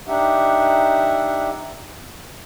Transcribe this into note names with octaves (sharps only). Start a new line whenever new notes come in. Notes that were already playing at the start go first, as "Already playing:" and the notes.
D4 D#4 G4 E5 F#5